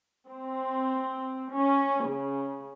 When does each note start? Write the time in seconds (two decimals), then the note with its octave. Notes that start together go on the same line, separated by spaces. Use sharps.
0.29 C4
1.52 C#4
2.05 C#3